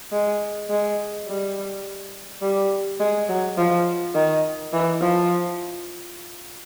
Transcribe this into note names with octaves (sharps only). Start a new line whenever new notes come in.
G#3
G#3
G3
G3
G#3
F#3
F3
D#3
E3
F3